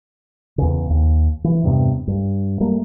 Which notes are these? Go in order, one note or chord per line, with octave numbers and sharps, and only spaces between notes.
E2 C#3
D#2
E3
E2 G2 C3 B3
G2
G3 A3 A#3